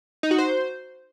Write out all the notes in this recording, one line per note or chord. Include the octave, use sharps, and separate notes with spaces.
D#4
F#4
C5